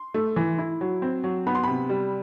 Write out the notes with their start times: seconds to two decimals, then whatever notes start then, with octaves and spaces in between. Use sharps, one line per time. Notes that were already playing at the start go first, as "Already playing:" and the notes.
Already playing: C6
0.14 A3
0.36 E3
0.59 E4
0.81 F#3
1.02 C4
1.24 F#3
1.47 B3 B5
1.55 C6
1.64 C3 B5
1.89 G3